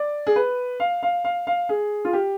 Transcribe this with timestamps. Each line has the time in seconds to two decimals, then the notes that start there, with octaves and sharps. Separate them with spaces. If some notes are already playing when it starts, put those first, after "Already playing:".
Already playing: D5
0.27 G#4
0.36 B4
0.80 F5
1.03 F5
1.24 F5
1.47 F5
1.69 G#4
2.05 F4
2.13 G4